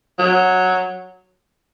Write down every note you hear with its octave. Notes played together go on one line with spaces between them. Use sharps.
F#3